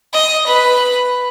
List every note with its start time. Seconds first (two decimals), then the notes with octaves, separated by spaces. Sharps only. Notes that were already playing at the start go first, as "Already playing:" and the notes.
0.13 D#5
0.47 B4